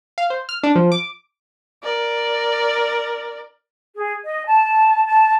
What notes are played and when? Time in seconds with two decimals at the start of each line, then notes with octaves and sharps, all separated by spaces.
0.18 F5
0.30 C5
0.49 F6
0.63 D4
0.76 F3
0.92 D6
1.83 A#4 D5
3.95 G#4
4.24 D#5
4.47 A5
5.06 A5